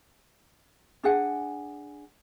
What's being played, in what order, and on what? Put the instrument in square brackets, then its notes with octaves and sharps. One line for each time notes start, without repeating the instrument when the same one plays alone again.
[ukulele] D4 G#4 F#5 G#5